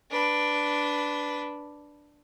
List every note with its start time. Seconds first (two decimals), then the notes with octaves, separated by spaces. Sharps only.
0.11 D4 B4